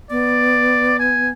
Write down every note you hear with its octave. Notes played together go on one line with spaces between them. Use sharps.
B3 D5
G#5